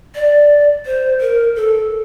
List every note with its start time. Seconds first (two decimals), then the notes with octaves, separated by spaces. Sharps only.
0.15 D5
0.86 C5
1.21 A#4
1.56 A4